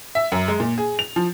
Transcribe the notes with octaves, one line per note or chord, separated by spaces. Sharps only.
E5
F#2
G#3
A#2
G#4
F7
F3